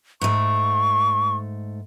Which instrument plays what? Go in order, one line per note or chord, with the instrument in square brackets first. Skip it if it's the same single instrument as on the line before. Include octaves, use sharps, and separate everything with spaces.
[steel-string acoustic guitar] G#2 A3 [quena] C#6